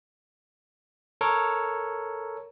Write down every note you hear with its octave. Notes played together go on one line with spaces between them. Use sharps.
A4 A#4 C#5